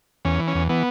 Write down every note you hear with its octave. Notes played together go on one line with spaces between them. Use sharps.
E2 C#4
E3
C#4
E2
E3 B3